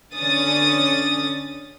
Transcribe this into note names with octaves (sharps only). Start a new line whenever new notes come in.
D3 C#4 D#6 A6